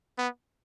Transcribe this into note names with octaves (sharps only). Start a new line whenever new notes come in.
B3